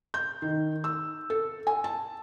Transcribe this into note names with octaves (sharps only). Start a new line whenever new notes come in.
G6
D#3
E6
A4
G#5
A5